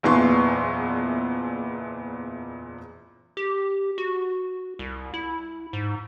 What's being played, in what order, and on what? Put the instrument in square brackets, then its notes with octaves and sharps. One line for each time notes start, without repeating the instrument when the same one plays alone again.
[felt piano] F#1 E2 A#2 E3 C6 C#6
[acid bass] G4
F#4
C2
E4
G#2